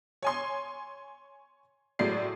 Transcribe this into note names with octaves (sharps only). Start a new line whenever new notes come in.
C#5 G#5 C6
A2 F#3 G#3 D5 C7